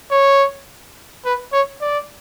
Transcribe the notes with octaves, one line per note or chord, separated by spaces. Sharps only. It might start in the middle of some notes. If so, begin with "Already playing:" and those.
C#5
B4
C#5
D5